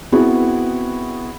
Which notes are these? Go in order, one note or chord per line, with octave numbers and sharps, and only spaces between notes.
B3 C4 E4 F#4 G#4